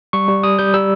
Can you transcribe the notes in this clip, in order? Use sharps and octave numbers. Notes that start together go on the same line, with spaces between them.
G3 C#6
G3
G3 D#6
G3 G6
G3 E6